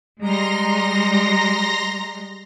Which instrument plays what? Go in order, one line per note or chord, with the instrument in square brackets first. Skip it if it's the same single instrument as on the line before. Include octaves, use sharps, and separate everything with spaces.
[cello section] G3 G#3 [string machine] A#5 C6 A#6